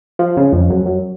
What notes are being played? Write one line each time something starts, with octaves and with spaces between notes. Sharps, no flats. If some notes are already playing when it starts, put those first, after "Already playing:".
F3
C#3
F2
F#2
F#2